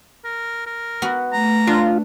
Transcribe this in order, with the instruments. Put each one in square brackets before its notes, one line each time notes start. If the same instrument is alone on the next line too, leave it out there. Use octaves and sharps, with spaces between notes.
[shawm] A#4
A#4
[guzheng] B3 F#4
[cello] A3 [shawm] A#5
[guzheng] D4 [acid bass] F4